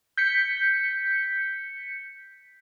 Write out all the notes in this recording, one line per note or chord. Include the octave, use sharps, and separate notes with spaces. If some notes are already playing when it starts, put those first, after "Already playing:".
G6 B6 C#7